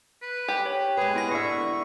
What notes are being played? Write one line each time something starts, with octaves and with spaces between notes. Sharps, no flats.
B4
G4
C#5
G#3 G#4 B4
B3 E4 A#6
D3 E5 C#6